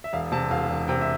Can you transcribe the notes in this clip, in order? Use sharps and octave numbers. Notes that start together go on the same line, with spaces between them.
E5
E1 F5
C3 A5
E1 F5
E1
C3 G5
E5